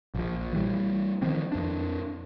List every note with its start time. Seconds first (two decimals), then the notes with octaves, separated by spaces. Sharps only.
0.15 A#1 F3
0.53 E3 G3
1.22 D#3 F3 C4
1.52 F2 D4